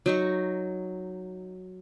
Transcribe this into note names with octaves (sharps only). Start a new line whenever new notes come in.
F#3 D#4 C#6